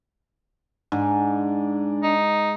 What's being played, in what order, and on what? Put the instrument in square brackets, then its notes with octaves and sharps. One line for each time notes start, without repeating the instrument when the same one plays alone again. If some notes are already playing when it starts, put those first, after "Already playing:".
[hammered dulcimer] G#2 [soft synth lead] D4
[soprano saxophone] D#4